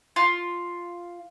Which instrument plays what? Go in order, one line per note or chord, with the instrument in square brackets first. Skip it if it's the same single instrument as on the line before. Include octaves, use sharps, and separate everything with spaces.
[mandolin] F4